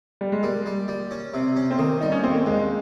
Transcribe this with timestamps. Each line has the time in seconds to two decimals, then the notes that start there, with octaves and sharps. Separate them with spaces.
0.21 G3
0.32 G#3
0.43 G3 A#3
0.66 G3
0.88 G3
1.11 C#4
1.34 C3
1.56 C#4
1.71 C4
1.78 D#3 A#3
2.01 G3 D#4
2.12 C#4
2.23 D#2 C4
2.35 A#3
2.46 D#2 G#3